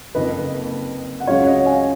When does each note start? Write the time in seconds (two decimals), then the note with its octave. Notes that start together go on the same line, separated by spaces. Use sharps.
0.15 F#1 F2 D#3 A#3 B4 D#5
1.20 F#5
1.27 C#2 C#3 F#3 C#5 F5
1.46 D#5 F#5
1.65 F5 G#5